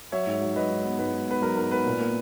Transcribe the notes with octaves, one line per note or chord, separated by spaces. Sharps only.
F#3 C#5 E5
G#2
F#3
F#3 B4 D#5
G#2
B3
G#2 B4
G#2
B3 B4
F#3 A#4
G#2 A#4
B3 B4
A#2
A#3